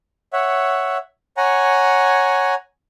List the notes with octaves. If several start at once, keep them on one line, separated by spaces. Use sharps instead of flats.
C#5 E5 F#5
C#5 F#5 G#5 A#5